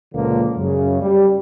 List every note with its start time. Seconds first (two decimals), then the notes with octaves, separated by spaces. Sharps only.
0.14 C#2 A#2 D3 F3 A#3
0.57 F#2 C#3
1.01 G3